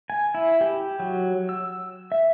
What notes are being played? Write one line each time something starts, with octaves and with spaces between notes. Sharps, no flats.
G#5
E4
G4
F#3
E6
E5